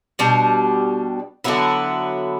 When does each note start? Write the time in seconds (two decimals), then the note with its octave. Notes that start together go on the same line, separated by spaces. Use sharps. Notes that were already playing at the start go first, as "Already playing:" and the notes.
0.19 B2 G3 D4
1.44 D3 F#3 B3 E4